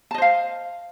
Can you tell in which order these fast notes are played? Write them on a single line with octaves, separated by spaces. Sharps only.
A5 D#5 C5 F5